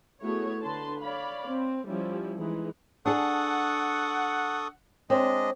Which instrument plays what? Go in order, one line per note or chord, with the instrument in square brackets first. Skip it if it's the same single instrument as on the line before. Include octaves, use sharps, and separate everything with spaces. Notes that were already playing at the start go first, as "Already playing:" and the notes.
[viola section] A3 B3 E4 F#4 G#4 C#5
D3 B4 A5 C6
C#5 D5 F5 B5
C4
F3 G3 C#4 E4
E3 G#3 D#4
[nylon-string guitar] D4 G#4 [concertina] A4 C#6 D#6 [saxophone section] F#5
[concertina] G#3 D4 D#5 [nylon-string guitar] C4 C#5